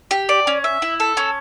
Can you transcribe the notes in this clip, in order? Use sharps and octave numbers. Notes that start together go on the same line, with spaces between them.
G4
D5
C#4
E5
E4
A4
C#4